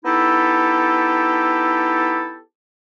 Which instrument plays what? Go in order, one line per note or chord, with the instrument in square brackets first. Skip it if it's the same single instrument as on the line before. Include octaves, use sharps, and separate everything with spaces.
[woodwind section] B3 D#4 E4 G4 A4